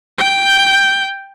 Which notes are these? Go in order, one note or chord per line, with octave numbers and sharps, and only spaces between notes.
G5 G6